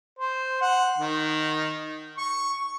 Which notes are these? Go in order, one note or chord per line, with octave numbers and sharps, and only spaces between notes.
C5
F#5
D#3
C#6